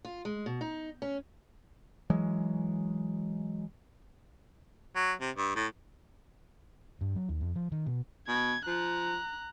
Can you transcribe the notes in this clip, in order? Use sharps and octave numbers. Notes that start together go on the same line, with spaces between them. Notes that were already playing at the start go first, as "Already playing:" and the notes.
F4
G#3
B2
D#4
C#4
E3 F#3 G#3
F#3
C3
G2
A2
G2
F#3
D#2
F2
F3
D#3
B2
B2 G#6
F3 A#5 F#6